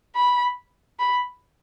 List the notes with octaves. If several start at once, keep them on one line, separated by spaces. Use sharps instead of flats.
B5
B5